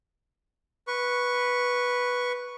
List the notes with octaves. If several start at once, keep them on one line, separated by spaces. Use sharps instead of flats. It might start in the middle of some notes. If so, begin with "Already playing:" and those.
B4 C#6